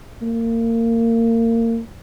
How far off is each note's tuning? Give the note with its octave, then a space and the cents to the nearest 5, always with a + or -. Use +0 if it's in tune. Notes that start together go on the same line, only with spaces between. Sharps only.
A#3 -30